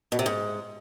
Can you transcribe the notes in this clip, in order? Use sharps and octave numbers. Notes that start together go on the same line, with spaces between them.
B2
C3
G#2